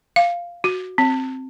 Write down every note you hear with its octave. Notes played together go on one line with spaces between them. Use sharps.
F5
F#4
C4